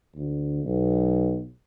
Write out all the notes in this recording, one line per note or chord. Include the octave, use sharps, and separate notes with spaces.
D2
B1